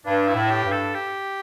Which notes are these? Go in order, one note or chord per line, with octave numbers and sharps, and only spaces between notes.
G2 D4
E4
A2
G4
G2
A4
G4